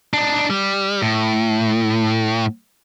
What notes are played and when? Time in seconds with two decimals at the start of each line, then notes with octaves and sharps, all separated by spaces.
0.14 D4 D#4
0.50 G3
1.02 A2